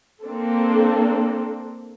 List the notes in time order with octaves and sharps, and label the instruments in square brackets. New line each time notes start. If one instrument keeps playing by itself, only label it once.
[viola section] A#3 C4 D4 A4